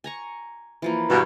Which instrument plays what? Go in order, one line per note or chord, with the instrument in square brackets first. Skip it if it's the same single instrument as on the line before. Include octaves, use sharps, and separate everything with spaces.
[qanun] G#5 A#5 C#6
E3 F3 A#3
[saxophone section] G2 B2 [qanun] B3 A#4